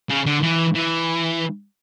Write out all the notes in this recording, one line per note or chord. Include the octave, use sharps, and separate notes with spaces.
C#3
D3
E3
E3